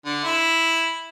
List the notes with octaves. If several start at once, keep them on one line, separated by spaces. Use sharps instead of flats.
D3
E4